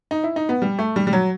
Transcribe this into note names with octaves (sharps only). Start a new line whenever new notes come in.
D#4
E4
D#4
B3
G3
A3
G3
G3
F#3